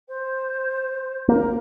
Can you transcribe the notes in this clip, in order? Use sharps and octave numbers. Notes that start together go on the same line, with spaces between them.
C5
A#3 A#4